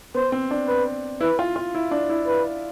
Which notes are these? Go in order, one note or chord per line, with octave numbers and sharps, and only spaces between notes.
B3 C5
C4
D4
B4
E4 B4
F4
F4
E4
D4
E4
B4